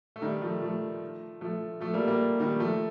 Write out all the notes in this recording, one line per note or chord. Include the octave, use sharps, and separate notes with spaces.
A3
D#3 G3
F3 A3
F3 A3
F3 A3
F3 A3
G3 A#3
G3 A#3
D#3 G3
F3 A3